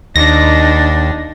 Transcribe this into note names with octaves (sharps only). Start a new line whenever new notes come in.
D#2 D4 D#4 A#6